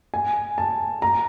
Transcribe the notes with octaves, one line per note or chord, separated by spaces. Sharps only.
G#5
A5
A#5